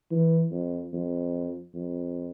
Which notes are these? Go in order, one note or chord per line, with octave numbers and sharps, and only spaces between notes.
E3
F2
F2
F2